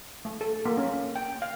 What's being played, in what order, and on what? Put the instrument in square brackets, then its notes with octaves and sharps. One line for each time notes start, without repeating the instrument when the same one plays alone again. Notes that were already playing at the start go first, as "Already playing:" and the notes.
[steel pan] A3
A4
A#3
C#4
G5
F5